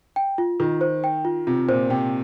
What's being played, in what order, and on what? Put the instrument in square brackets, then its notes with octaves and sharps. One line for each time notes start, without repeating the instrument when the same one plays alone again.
[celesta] G5
F4
[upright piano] D#3 [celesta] F4
[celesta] C5
G5
F4
[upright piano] C3 [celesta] F4
[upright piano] A#2 [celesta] C5
[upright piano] C3 [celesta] G5